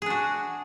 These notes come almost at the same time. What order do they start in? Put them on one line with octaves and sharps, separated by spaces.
G#4 D4 F#4